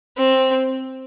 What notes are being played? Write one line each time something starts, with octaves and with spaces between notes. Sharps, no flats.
C4